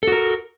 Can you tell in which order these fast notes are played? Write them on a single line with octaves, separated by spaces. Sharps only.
A4 F#4 A#4